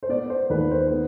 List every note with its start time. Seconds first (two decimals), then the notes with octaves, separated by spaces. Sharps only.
0.03 C5
0.09 B3 D5
0.30 C5
0.50 D#2 B4
0.71 C5
0.91 B3